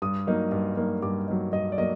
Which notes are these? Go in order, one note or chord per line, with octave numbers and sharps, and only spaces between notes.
G2 D#6
F#3 A#3 D#4
G2
F#3 A#3 D#4
G2 D6
F#3 A#3 D#4
G2 D#5
D5
F#3 A#3 D#5